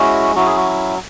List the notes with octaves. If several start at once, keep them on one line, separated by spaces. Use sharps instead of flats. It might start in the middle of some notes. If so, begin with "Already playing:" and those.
Already playing: G#3 C#4 E4 F#4
F#3 C#4 E4 F#4
G#4
F#4